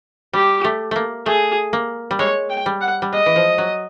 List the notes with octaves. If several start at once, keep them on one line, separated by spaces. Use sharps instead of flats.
G3 G4
A3
A3 A#3
A3 G#4
A#3
G3
G#3 C#5
G5
G3
F#5
G3
G#3 D#5
E3
F3
F#3